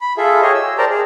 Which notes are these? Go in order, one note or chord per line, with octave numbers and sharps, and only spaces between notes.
B5
F4 G#4 A4 E5
G4 G#4 C#5 D#5
E6
A#4 C5 D5 G5 A5 A#5
G#4